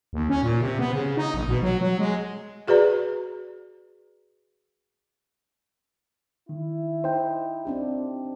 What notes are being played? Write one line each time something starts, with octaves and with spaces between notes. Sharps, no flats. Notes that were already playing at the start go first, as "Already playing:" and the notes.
D#2
C#4
A#2
C3
B3
C#3
D#4
A#1
B2
F#3
F#3
G#3
F#4 G#4 B4 D5 A#5
D#3 E4
D#4 C5 G5
C4 D4 G4